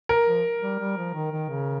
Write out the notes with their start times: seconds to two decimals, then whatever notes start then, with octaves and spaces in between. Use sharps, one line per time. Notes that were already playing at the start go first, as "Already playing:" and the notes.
0.09 A#4
0.27 F3
0.62 G3
0.79 G3
0.97 F3
1.14 D#3
1.32 D#3
1.49 C#3